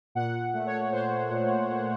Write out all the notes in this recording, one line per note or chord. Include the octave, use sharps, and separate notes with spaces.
A#2 F#5
A3
C#5
A#2 C5
A#2
A#2